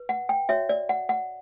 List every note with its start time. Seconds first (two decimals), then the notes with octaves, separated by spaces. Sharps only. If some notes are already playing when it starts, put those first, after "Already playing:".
Already playing: B4
0.09 F#5
0.29 G5
0.49 F#4 C#5 E5
0.69 D5
0.89 F#5
1.09 F#5